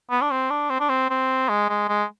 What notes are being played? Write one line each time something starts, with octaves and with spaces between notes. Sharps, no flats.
B3
D4
C4
D4
C4
D4
C4
C4
G#3
G#3
G#3